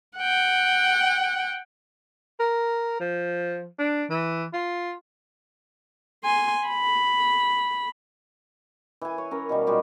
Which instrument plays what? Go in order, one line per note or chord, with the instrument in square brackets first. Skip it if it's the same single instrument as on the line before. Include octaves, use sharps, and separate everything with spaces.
[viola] F#5 G5
[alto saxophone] A#4
F3
D4
E3
F4
[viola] G#5 C6
B5
[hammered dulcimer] E3 G#5
C#5
C#4 A#4
B2 D#3 G3
A#2 G3 G#3 F#4